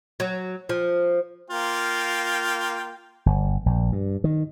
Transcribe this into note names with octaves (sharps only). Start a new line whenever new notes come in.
F#3
F3
A#3 F4 G5
G1
A#1
G2
D#3